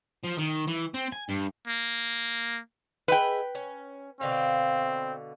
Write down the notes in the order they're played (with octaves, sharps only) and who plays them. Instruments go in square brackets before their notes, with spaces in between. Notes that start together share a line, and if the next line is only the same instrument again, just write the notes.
[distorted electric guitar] F3
D#3
E3
C4
G#5
G2
[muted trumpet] A#3
[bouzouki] G#4 D#5 E5 [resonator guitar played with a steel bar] B4 G5
[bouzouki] C#4
[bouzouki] B2 D3 F5 [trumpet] C4